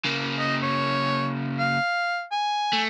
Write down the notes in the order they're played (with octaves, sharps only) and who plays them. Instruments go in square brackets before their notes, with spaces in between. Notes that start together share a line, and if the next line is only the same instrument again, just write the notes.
[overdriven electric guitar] C#3 A#3
[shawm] D#5
C#5
F5
G#5
[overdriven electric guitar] A3